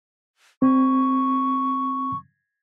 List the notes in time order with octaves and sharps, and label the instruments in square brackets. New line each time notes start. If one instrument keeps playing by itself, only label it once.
[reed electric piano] C4 [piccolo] C#6